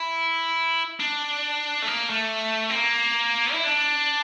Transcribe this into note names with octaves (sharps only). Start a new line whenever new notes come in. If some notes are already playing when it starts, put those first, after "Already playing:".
Already playing: E4
D4
A3
A#3
A3
C4
A#3
E4
D4